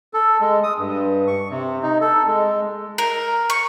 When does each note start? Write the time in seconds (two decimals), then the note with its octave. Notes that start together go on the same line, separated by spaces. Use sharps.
0.14 A4
0.41 G#3
0.63 D#6
0.78 G2
1.27 C#6
1.50 C3
1.83 D#4
2.01 A4
2.27 G#3
2.98 A#4
3.50 C#6